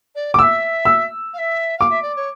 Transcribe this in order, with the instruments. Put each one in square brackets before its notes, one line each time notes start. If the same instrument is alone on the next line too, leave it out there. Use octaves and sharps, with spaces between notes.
[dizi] D5
[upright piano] D6
[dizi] E5 F5 [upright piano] E6
[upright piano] E6
[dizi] F5
E5
[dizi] F5 [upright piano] D6
[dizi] E5
D5
C#5